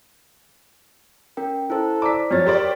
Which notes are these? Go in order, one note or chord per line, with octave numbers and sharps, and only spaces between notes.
C#4 A#4 G5
E4 A4 C5
C5 D5 A#5 D6 B6
F2 F#3 C#5 F6 A6
G4 A#4 C5 D5